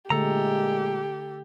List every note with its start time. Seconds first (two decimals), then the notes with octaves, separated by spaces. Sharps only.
0.10 A#2 D3 G#3 A3 G4 A4 A#5